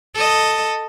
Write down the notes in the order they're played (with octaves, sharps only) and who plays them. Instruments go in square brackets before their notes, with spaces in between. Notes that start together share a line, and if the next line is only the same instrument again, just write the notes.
[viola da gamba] A4 D#5